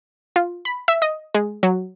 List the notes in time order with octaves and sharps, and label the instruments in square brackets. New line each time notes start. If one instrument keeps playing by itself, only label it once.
[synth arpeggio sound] F4
B5
E5
D#5
G#3
F#3